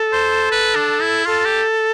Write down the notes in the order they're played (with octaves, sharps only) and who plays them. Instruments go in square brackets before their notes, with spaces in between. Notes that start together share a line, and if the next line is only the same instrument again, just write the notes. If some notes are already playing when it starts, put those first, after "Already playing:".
Already playing: [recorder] A4
[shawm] C5
B4
D4
E4
[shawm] F4 [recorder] A4
[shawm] G4